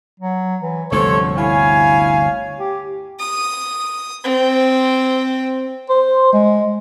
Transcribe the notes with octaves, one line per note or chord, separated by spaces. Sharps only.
F#3
E3
G1 D2 C3 F3 A4 C5 C#5
E4 C#5 F5 G#5
G4
D#6
C4
C5
G#3